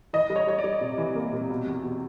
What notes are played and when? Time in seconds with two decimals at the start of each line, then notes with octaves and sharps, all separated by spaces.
0.13 E3 D#5
0.30 G3
0.36 C#5
0.47 G3 C#5
0.59 D5
0.64 G3
0.81 C3
0.98 E3
1.15 A#3
1.33 C3
1.50 B2
1.67 E2
1.83 B2